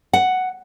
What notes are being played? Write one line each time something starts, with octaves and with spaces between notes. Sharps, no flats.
F#5